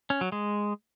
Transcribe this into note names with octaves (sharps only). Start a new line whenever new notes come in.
C#4
F#3
G#3